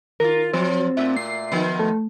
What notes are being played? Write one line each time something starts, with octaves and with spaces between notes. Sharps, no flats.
D#3 F4 A#4
F3 F#3 C4
A#2 A3 E5
C7
D#3 F3 B3
A3